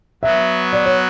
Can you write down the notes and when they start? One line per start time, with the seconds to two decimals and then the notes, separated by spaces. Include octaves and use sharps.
0.23 F#3 B3 F#4 E5
0.73 D5
0.86 C#5